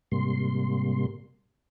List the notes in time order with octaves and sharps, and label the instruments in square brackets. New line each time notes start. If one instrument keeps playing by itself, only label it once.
[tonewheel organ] G#2 C3 G3 A#3 C6